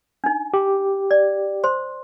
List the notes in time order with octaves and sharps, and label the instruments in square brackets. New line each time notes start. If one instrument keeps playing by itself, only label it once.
[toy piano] D4 D#4
[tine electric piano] G4
[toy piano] D5
C5 C6